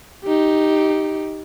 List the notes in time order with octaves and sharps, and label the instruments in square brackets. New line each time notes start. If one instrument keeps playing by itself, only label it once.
[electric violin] D#4 G4